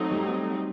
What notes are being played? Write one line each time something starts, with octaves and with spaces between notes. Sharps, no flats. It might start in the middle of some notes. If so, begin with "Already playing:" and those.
Already playing: F#3 A3 C4 D#4
G3